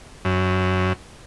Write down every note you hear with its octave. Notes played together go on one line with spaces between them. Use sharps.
F#2